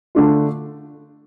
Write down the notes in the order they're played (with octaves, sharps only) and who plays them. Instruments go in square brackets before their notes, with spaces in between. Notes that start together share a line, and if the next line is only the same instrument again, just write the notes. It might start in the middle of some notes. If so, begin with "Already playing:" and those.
[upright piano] D3 A3 D4 F4